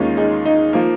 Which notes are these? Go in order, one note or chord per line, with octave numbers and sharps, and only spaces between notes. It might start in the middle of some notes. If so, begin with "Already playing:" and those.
Already playing: D#2 D#3 G#3 C#4 D#4 F4
D#4 G#4
D#4
F3 A#3